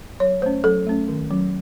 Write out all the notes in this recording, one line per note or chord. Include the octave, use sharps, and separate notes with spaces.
F#3 C#5
A3 C#4 C5
F#3 A4
A3 C#4
D#3
F#3 C#4